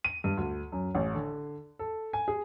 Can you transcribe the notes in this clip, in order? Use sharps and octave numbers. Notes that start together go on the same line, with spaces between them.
D#7
G2
D2
F#2
A1
D3
A4
G#5
G#4